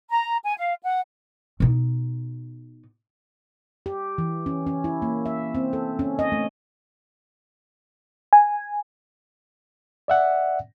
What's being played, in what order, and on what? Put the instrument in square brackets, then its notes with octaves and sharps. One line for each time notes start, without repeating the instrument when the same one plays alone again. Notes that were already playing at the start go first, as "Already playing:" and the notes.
[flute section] A#5
G#5
F5
F#5
[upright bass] B2 D#4
[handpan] G4
E3
C#4
C#4
E4
A#3
E5
C4
A4
C#4
D#5
A3
[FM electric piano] G#5
[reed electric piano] D5 E5 F#5